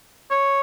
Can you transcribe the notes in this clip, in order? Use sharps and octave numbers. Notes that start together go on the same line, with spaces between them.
C#5